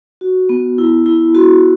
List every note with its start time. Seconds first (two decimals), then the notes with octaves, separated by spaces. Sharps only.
0.21 F#4
0.49 B3
0.78 E4
1.06 E4
1.35 B3 F#4